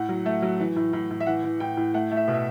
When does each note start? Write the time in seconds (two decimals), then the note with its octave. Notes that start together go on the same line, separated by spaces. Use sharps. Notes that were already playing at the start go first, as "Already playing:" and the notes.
Already playing: A2 F#5
0.09 F#3
0.26 A3
0.42 F#3
0.60 E3
0.76 A2
0.93 A2
1.10 A2
1.20 E5
1.26 E3 F#5
1.44 E3
1.60 A2 G5
1.77 A2
1.94 A3 F#5
2.11 A3
2.17 E5
2.28 B2
2.34 E5